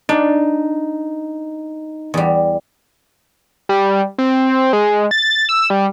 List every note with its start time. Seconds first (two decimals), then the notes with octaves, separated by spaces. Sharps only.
0.09 D4 D#4
2.14 E2 G3
3.69 G3
4.18 C4
4.73 G#3
5.11 A6
5.49 E6
5.70 G3